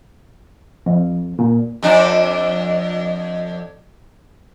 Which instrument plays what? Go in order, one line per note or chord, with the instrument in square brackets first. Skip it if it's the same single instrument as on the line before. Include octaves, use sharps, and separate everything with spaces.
[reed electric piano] F2
A#2
[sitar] F2 D4